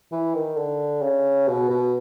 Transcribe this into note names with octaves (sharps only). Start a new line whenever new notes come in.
E3
D#3
D3
C#3
B2
B2